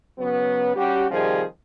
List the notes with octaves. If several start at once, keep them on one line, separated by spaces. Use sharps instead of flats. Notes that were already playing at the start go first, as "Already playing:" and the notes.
C#3 F#3 B3
G3 C#4 F#4 G4
C3 D#3 F3 G3 C4 G#4